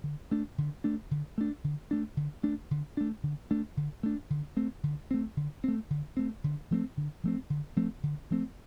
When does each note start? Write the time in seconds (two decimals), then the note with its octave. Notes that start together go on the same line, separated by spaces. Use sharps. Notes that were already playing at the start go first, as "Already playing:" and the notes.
0.04 D3
0.31 A3 D4
0.58 D3
0.84 A3 D4
1.11 D3
1.38 A3 D4
1.64 D3
1.91 A3 D4
2.17 D3
2.43 A3 D4
2.71 D3
2.97 A3 D4
3.23 D3
3.51 A3 D4
3.77 D3
4.03 A3 D4
4.30 D3
4.57 A3 C4
4.83 D3
5.11 A3 C4
5.37 D3
5.64 A3 C4
5.90 D3
6.17 A3 C4
6.44 D3
6.71 F3 A3 C4
6.97 D3
7.24 F3 A3 C4
7.50 D3
7.76 F3 A3 C4
8.03 D3
8.31 F3 A3 C4